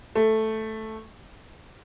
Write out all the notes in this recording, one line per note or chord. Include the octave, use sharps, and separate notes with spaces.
A3